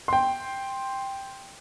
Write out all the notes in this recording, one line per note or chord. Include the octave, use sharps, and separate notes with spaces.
G5 C6